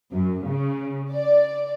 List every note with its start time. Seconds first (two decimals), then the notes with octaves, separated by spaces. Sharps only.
0.12 F#2
0.46 C#3
1.12 D5